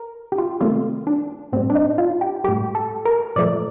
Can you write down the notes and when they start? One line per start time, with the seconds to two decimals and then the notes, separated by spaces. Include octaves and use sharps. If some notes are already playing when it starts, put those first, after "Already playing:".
Already playing: A#4
0.32 G4
0.38 F4
0.61 C3 D#3 A3 F4
1.07 D4
1.52 A2 C4
1.56 G3
1.70 D4
1.75 D#4
1.98 F4
2.21 G4
2.44 A2 G3 G4
2.75 A4
3.05 A#4
3.36 A#2 F3 A3 D5